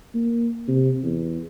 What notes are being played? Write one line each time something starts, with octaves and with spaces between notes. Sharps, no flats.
A#3
C3
E2